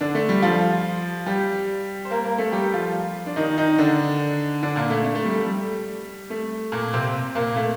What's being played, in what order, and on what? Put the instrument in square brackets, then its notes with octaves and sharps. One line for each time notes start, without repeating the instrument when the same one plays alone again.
[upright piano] D3 D4
A3
G3
F3 F4
G3 G4
C5
A#3 A#4
A#3 A#4
A3 A4
G3 G4
F3 F4
D4
D#3 D#4
D#3 D#4
D3 D4
D3 D4
A#2 A#3
A3
A3
A3
G3
A3
G3
A3
A#2 A#3
C3 C4
A#2 A#3
A3